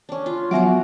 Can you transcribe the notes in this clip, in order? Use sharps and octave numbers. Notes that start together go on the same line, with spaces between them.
C#4 D4
F4
F3 F#3 B3 F#4 E5 F#5 A#5 D6